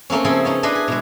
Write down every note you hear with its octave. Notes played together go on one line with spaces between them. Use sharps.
A3 A#3 C4 C#4
C#3 F3 C4 E4 G#4 A4
B3 C#4 D#4
D4 E4 A4 B4 D#5 C6
G#4
B2 G#3